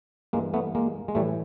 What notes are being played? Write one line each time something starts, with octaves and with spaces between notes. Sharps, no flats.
G2 E3 G#3 A#3
A3 B3
G#3 A#3
G#3
A2 E3 G3 A3